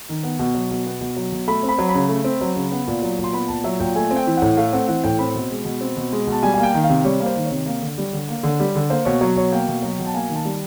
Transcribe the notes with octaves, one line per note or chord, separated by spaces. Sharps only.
D#3
B3
B2
F#3
B2
B3
B2
F#3
B2
A3 B5
C4
B5
F#3
B5
C#3
A3
C4
F#3
C#3
B3
A#2
F#3
A#2
C6
B3 B5
A#2 A5
F#3 E5
A#2 G5
A3 G#5
C4
G5
E3
A2 F#5
A3 F5
C4 F#5
E3 F#5
A2 G5
C4 B5
B2
G#3
B2
C4
B2
G#3
B2
A5
G3 G#5
A#3 G#5
G5
D#3
F5
C3
G3 C#5
A#3
C5
D#3
C#5
C3
A#3
D3
G3
D3
A#3
D3
G3
D3
A#3 C5
B2 C#5
F#3 C#5
B2 C#5
A#3 G5
B2
F#3
B2
A5
A#3 G#5
D#3
A5
G3